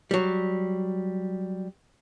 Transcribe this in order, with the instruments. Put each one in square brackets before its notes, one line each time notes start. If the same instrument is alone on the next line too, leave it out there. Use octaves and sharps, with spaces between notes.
[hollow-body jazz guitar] F#3 G3